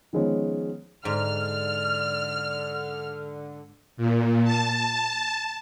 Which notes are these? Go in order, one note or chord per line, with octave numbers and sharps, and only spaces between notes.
D#3 F3 G#3 B3 C#4
G#2 D3 D5 F6
A#2
A5